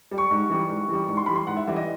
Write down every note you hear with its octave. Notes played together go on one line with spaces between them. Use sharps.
G3
C#6
G#2
E3 G3
G#2
E3 G3
G#2 C#6
C6
E3 G3 B5
C6
G#2 F#5
E5
E3 G3 E5
D#5